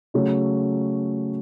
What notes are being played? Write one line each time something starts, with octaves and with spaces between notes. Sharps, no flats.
C#3 F#3 A3 C#4